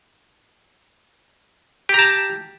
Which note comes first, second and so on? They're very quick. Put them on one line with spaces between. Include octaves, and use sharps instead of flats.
G4 A#5 A5